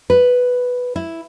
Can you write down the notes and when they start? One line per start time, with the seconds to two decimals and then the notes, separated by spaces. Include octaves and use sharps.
0.10 B4
0.96 E4